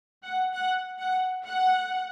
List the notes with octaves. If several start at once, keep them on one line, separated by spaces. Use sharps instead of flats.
F#5
F#5
F#5
F#5